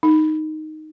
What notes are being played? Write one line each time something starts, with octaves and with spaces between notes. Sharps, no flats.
D#4